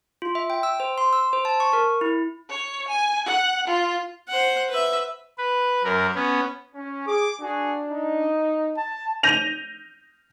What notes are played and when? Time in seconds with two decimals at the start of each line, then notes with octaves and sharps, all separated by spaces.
0.22 F4
0.35 E5
0.50 G5
0.63 E6
0.80 C5
0.98 C6
1.13 E6
1.33 C5
1.45 A5
1.60 C#6
1.73 A#4
2.01 E4
2.50 C#5
2.88 G#5
3.26 F#5
3.67 F4
4.29 C5 F#5
4.70 B4 E5
5.38 B4
5.84 F#2 A#4
6.15 B3 C#4
6.75 C#4
7.08 G#4 D6
7.41 D4 F#4 G#4
7.91 D#4
8.77 A5
9.23 G6 A#6 D#7 F7